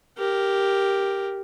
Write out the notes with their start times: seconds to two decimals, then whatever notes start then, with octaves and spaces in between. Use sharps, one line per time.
0.18 G4 A#4